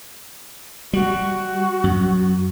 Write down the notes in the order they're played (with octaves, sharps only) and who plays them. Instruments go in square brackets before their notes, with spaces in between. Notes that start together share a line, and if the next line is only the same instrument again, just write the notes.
[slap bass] G3 [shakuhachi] F#4
[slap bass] F#2